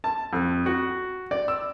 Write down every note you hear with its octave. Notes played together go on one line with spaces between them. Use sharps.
A5
F2
F#4
D5
E6